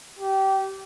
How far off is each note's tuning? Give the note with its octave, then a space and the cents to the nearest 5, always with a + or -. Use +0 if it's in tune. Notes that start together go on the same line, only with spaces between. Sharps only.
G4 -20